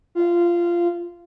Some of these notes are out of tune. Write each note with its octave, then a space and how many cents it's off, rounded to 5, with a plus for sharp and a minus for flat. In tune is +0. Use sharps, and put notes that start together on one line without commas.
F4 -15